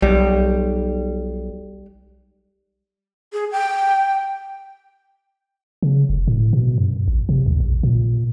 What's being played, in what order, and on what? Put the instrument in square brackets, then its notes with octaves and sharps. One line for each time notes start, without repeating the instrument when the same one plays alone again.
[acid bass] B1 [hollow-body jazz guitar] G3
[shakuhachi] G#4
G5
[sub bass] C#3
F1
A2
B2
F#2
A1
C3
D#2
A#1
A#2